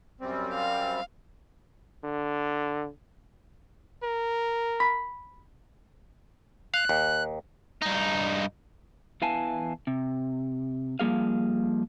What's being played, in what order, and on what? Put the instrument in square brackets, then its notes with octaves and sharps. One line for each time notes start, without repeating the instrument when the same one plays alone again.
[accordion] F#2 G3 C4
[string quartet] F5
[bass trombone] D3
[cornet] A#4
[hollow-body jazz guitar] B5
[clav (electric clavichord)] F5 [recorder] F#6
[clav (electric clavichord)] D#2
[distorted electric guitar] G2 D#4
[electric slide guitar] E2 E3 F5 G#5 A5
C3
F3 G3 A#3 G#4 F5